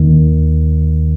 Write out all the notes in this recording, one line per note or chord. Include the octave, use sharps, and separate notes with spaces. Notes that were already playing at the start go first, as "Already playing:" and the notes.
Already playing: D#2 D#3